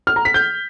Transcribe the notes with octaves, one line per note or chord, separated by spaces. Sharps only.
F6
A#5
B6
G6